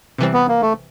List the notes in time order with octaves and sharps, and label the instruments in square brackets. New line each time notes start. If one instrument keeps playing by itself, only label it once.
[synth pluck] C3 E3 G3 C4
[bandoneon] B3
A#3
A3